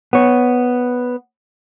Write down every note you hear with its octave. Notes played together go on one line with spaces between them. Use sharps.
B3 C#5